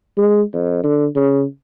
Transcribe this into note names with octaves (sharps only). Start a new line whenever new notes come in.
G#3
F2
D3
C#3